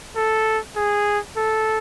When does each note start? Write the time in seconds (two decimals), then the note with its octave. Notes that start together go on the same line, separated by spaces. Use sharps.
0.16 A4
0.76 G#4
1.36 A4